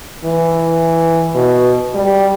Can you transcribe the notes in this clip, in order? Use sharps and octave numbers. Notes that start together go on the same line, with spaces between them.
E3
B2
G3